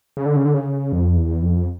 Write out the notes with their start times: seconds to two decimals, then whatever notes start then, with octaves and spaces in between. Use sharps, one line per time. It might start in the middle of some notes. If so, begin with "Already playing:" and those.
0.17 C#3
0.26 D3
0.36 C#3
0.45 D3
0.54 C#3
0.92 F2
1.17 E2
1.42 F2